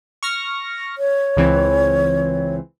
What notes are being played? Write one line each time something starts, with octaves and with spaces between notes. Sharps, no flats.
C#6 F6 A#6
C#5
C#2 E3 C4